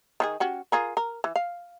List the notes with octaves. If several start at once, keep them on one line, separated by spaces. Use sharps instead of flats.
D#3 D4 G#4
C#4 F#4 G4
F4 G#4 A#4
A#4
E3
F5